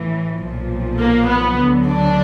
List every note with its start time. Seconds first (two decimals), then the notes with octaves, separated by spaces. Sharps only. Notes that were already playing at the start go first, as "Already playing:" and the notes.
Already playing: A1 A2 E3
0.42 B1 A#2 F3
1.00 A#3
1.29 B3
1.58 D2 D3 F#3
1.87 D4